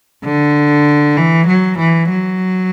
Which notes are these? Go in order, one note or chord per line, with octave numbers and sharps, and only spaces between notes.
D3
E3
F#3
E3
F#3